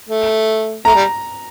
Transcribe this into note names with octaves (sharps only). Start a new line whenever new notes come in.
A3
A3 A#5
G3